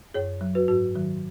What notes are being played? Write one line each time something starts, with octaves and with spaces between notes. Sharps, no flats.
F#2 G#4 C#5
F#3
F#4 B4
G#2 F#4
D#3 F#3